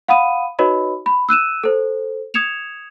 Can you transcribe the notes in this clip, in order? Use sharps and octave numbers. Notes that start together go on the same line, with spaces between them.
F5 F#5 B5 D#6 D#7
D#4 F#4 B4 C#5 D#5 B5
B5
E6 F#6 D#7 E7
A4 C5
D#6 G#6 C#7 E7 F7